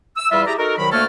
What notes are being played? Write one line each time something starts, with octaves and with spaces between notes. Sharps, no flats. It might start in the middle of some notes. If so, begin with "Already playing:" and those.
E6
E2 G3 E4 F4 E5
E4 G4 G#4 D5 A#5
D#4 F#4 A4 A#4
C2 D#3 F#3 B5
D2 A3 A#3 A4 C#5 F6